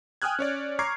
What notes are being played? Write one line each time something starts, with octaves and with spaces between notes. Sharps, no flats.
G5 G#5 D#6 F6 F#6 G#6
C#4 C#5 D5
A#5 C#6 D6 F6 G#6 C7